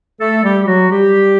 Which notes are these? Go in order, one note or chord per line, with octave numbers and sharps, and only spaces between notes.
A3 A4
G3 G4
G4
F#3 F#4
G3 G4